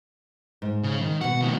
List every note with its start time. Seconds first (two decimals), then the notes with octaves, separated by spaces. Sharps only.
0.62 G#2
0.83 C#3
1.02 D#3
1.21 B2 F#4 F#5
1.42 A2 D#3